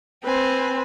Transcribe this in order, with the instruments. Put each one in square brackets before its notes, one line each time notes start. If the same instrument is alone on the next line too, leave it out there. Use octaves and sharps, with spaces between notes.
[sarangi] C4 [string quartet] B4 C5 G#5